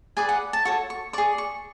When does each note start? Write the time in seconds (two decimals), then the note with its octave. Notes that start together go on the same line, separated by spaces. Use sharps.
0.17 G#4 B4 D5 G#5
0.29 F#5
0.53 A5
0.65 F#4 A4 C#5 C#6
0.90 C#6
1.13 G#4 D5 C#6
1.38 C#6